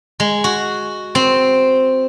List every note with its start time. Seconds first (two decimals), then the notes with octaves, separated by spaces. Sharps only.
0.20 G#3
0.44 F#4
1.15 C4